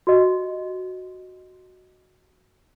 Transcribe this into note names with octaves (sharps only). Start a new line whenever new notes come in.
F#4 G4 D#5